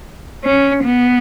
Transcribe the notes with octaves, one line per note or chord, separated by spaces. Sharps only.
C#4
B3